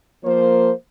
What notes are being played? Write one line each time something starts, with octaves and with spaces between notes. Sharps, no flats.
F3 A#3 C5